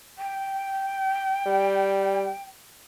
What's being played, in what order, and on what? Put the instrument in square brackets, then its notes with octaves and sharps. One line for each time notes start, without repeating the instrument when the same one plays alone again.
[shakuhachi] G5
[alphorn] G3